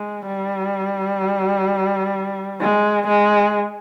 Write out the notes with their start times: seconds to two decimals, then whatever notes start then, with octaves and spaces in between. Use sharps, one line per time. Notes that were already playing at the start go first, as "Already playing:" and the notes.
Already playing: G#3
0.26 G3
2.61 G#3
3.08 G#3